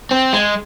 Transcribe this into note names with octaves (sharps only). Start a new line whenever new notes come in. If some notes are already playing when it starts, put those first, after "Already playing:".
C4
G#3